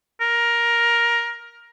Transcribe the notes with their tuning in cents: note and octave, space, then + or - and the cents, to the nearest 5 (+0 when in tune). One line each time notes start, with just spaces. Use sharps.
A#4 +10